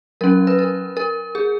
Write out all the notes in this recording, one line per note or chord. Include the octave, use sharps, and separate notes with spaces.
F#3 C#4 A#4
B4
A#4
A#4
G#4